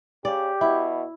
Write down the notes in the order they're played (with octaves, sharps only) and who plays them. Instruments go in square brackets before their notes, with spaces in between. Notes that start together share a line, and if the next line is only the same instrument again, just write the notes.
[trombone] C#3 [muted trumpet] G4 [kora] D5
[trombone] B2 [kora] E4 [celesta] E5